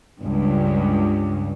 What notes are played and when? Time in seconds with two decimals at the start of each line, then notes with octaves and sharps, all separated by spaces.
0.20 C#2 G2